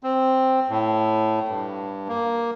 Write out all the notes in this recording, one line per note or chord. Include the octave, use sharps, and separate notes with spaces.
C4
A2
G2
A#3